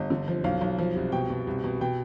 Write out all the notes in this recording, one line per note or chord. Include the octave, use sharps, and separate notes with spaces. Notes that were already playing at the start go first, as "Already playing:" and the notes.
Already playing: G1 D#5
D3
F3
B1 F5
B1
F3
C2
B2 G5
B2
C2
B2
B2 G5